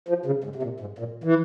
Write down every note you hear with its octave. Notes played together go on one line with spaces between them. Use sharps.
F3
C#3
G#2
C3
A#2
G#2
A#2
E3